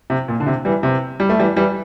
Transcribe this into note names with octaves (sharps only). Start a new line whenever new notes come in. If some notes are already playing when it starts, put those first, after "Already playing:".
C3
A#2
D3
C3
E3 G3
C3
G3
A3
E3 G3
E3 G3